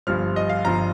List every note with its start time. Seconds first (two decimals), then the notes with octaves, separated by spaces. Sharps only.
0.07 G1 G2 F3 F6
0.36 D#5
0.49 F5
0.65 G1 G2 F3 A#5